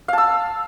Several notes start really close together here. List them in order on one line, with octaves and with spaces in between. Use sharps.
F5 A5 E6